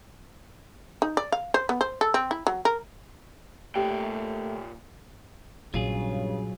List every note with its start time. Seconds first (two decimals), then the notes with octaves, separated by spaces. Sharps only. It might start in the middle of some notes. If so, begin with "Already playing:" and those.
1.02 D#4
1.17 D5
1.32 F5
1.54 C5
1.69 B3
1.81 C5
2.01 A4
2.14 C4
2.31 E4
2.47 F#3
2.65 A#4
3.76 A#2 A3 G4 G5
5.74 A#1 G2 C#3 F#3 F4 G#4